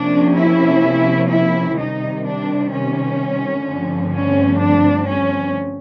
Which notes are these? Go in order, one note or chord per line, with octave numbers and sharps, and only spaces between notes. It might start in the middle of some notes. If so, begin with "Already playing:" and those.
Already playing: C3 F3 A#3 C#4 D4
E4
E4
C3 D#3 G3 D#4
D4
C#4
G2 D3 F3 A3 C4
C#4
D4
C#4